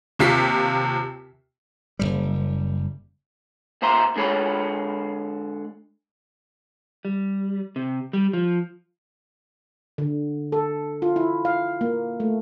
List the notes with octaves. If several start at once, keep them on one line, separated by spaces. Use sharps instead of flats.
D#2 C3 F4 B6 C7
F#1 C#2 G3
A#2 C5 E5 A#5 C6
D3 G#3 G#4 C#5 B5
G3
C3
G3
F3
D3
A4
F4
E4
F5
A#3
A3